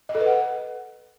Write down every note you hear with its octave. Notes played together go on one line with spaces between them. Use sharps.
D#5
A4
B4
F#5